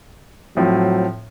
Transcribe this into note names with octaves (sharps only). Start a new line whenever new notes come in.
A2 F3 F#3 C4